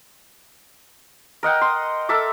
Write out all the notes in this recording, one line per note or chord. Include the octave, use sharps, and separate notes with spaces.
A#4 D#5 F#5 G5
C6
A4 A#4 E5 D6